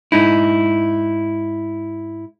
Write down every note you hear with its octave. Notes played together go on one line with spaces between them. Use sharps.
G#2 D#4 E4